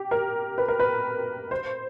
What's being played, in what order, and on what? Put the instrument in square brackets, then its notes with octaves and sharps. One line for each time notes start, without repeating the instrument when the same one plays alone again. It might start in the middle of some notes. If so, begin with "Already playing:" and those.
Already playing: [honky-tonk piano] G4
A#4
B4
A#4
B4
C5